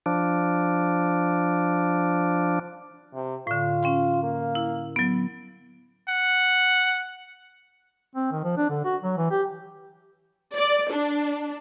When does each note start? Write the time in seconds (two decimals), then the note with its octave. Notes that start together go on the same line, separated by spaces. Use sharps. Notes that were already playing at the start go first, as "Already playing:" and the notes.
0.06 F3 D4
3.14 C3
3.47 A2 D3 F4
3.83 C#4 G5 C6
4.23 A#3
4.55 E4
4.96 F#3 B3
6.08 F#5
8.15 C4
8.32 D#3
8.44 F3
8.57 D4
8.70 D3
8.85 F#4
9.02 F#3
9.17 E3
9.31 G4
10.56 D5
10.91 D4